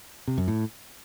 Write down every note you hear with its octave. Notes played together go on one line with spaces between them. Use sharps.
C3
F#2
A2